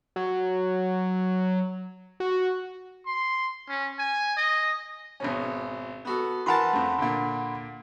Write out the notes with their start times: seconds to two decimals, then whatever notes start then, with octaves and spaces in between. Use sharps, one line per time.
0.16 F#3
2.20 F#4
3.06 C6
3.69 C#4
3.99 G#5
4.37 D#5
5.20 G#1 B2 C#4
6.05 B3 F#4 A4
6.46 E3 A#4 F#5 A5 B5 C6
6.73 F2 A3
6.98 A#2 D3